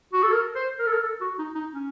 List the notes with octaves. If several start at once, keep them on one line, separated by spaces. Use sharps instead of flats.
F#4
A4
A#4
C5
A#4
A4
A#4
A4
F#4
D#4
D#4
C#4